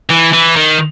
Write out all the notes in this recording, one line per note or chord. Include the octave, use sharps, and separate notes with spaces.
E3
E3
D#3